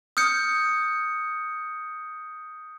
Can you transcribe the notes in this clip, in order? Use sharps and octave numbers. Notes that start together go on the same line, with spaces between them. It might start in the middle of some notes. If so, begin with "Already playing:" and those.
D#6 F6 G6 C#7